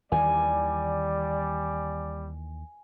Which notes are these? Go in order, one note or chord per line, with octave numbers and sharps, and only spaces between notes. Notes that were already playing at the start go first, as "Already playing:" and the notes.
D#2 D#3 E3 G3 D5 G#5